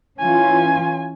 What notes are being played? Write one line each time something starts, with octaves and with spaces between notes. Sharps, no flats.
E3 C#4 F4 G#5